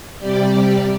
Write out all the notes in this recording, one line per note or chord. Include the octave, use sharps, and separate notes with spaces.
C3 G3 G4 D5